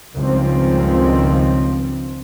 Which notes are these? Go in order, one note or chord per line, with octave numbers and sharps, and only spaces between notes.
C#2 G2 D#3 F3 C4